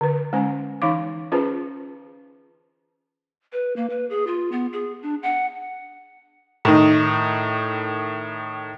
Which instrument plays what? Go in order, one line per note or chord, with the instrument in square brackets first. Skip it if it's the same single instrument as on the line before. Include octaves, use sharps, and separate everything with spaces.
[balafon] D3 B4
G#3 C#4 C5 G#5
E3 D#4 F5 D6
C#4 F4 G#4 B4 C5 A5
[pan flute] B4
A#3
B4
G#4
F4
B3
G#4
D4
F#5
[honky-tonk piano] A2 D#3 D#4